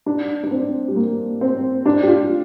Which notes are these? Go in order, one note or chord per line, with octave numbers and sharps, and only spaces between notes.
D4
D4
C4
G3
A#3
C4
D4
G4
F4